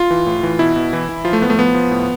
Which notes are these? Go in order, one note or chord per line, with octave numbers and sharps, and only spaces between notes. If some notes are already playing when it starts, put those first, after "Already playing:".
Already playing: F4
E3
A2
E3
B2 E4
B2
E3
E3
F3 F4
A3
A2 B3
A3
F3 B3
F3
A2